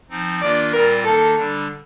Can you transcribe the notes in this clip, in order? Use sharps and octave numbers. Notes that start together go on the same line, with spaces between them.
F3 C4 D#4
D#3 A#3 D4 F4 D5
A#2 G3 C4 F4 A#4
D#3 A#3 D#4 A4
D3 G3 D4